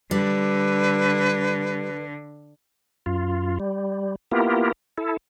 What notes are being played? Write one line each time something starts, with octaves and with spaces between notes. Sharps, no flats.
D3 G3 B4
F#2 F4
G3
A#3 B3 E4 F4 G4 A#4
E4 A4